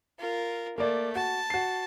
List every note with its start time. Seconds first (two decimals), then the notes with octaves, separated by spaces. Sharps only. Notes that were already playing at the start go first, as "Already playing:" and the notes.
0.19 F4 A#4
0.78 A3 A#3 D5
1.15 F#4 A5
1.50 F#4 C7